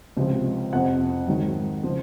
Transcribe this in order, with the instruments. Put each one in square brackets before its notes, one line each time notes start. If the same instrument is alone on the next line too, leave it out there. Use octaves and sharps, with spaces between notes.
[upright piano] C#2 C3 F3
F2 C3 F3 F#5
G#2 D#3 F#3
C#3 F3